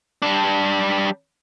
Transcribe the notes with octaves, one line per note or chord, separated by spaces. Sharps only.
G3 D4